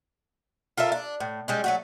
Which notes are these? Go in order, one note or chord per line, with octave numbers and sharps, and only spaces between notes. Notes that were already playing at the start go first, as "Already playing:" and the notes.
F4 A4 A#4 E5
D4
A2
G3 G#3 C#4
F#3 A3 F#4